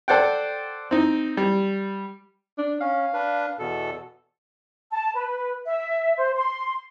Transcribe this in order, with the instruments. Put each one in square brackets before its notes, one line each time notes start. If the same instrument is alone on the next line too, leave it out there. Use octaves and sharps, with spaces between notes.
[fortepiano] A4 C5 D5 F#5 G5
C4 D#4
G3
[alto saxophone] D4
[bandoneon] C#4 [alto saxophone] F5
[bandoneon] D4 B4
E2 B2 A4
[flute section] A5
B4
E5
C5
C6